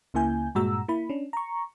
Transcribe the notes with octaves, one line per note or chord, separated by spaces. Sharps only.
C#2 C#3 A#3 E4 G#5 G6
G2 A#2 G#3 F#4 A#5 E6
A#3 E4 B5
C#4 D4
A#5 C#6